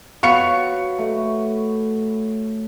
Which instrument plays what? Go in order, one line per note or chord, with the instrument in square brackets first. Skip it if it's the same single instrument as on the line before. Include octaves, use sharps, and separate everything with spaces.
[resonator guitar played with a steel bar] B3 F5 [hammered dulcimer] F#4 C#5 [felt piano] C#6 C#7
[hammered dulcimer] A3